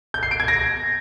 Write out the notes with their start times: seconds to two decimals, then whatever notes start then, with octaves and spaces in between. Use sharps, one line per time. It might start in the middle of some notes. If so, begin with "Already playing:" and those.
0.14 G6
0.23 C7
0.31 D7
0.40 G#6
0.48 A#6